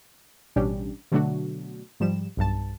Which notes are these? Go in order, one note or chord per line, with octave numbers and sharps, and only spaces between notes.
A1 B2 G3 C#4 D4 G4
B2 D3 F#3 A3 D4 F#4
G#2 F3 G3 E7
B1 G2 A5